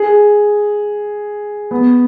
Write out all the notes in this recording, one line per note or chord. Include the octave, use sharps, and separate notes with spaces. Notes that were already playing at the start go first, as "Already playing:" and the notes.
Already playing: G#4
B3